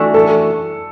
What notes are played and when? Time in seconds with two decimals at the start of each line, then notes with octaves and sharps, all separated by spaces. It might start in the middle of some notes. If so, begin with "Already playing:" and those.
Already playing: E3 A3 D4 F#4
0.14 A4